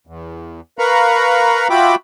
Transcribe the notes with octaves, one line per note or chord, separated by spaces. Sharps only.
E2
A#4 B4 F5 A#5 B5 C#6
F4 F#4 E5 G5 B5 D6